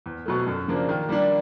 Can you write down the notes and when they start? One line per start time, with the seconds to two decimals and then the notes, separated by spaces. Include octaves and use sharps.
0.06 E2
0.26 B2 F#3 A3
0.47 F#2
0.68 C#3 F3 A#3 D4
0.89 D#3
1.09 G3 A#3 D4